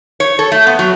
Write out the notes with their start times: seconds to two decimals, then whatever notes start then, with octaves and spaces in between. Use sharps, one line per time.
0.20 C#5
0.39 A4
0.52 A3
0.67 B3
0.79 F#3